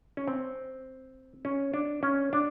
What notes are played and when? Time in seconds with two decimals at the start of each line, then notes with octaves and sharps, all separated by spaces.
0.17 C#4
0.28 C4
1.45 C#4
1.74 D4
2.03 C#4
2.33 D4